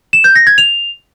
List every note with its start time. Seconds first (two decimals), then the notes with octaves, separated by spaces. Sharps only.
0.13 E7
0.24 G6
0.35 A#6
0.47 G#6
0.58 F7